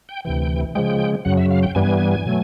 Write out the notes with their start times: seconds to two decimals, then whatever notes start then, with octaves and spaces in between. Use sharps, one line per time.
0.09 G5
0.25 D2 C3 E3 G5
0.75 C#3 F3 G#3 G5
1.25 F#2 C#3 F#3 F#5
1.37 E5
1.51 F5
1.63 G5
1.75 G2 E3 G3 B3 G#5
2.25 B2 F#3 A3